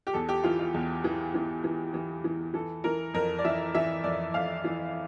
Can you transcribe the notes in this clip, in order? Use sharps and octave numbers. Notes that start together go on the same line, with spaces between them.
G4
E2 A4
G4
E3 F4
F4
E2
E3
E3
E3
E3
E3
E3 A4
E3 A#4
F2 A#4
D5
E3 E5
E3 E5
F2 D5
F2 F5
E3